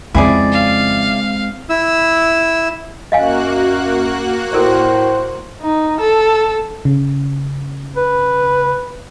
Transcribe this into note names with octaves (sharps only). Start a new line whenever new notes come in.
F2 C#3 G#3 C4 E4 G#4 D5
F5
E4 E6
F#2 A#3 F#4 D#5 F5 G#5 F#6
A2 A4 A#4 C5 D5
D#4
A4
C#3
B4